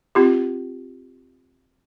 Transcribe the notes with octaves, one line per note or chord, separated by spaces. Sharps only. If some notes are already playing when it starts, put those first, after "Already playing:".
C4 F4 G4